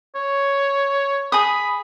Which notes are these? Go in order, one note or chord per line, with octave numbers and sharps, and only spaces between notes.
C#5
G#4 B5 D#6